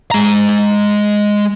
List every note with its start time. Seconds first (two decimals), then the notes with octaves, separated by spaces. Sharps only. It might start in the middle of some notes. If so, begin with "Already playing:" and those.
0.11 G#3 A#5